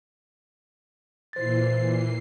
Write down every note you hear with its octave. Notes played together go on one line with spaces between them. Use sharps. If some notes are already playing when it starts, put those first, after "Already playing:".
A#2 E3 C5 A6 C7